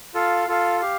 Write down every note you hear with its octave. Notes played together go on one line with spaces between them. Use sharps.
F4 A4 F5
F4 A4 F5
G4 F5